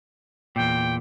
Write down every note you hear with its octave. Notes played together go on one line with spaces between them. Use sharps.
E2 A#2 G5